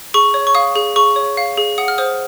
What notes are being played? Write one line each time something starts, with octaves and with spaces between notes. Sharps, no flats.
G#4 C#6
C#5
C#6
F5 D#6
G#4
G#4 C#6
C#5
F5
G#4
F#5 D#6
F6
C5 D#6